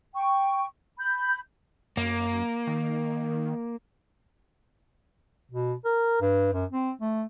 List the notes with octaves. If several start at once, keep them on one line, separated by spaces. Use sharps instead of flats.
G5 C#6
B5 G6
F#2 A#3
D#3
B2
A#4
G2
F#2
C4
A3